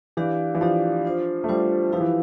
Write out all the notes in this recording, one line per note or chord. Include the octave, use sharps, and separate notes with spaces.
E3 D4 G4 D5 F5
E3
F3 D4 G4 D5 F5
D4 F4 C5
A3
G3 D4 F4 C5
F3 E4 G4 B4 F5
E3